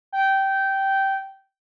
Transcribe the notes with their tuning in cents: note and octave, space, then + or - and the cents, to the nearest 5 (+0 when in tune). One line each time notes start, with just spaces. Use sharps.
G5 -15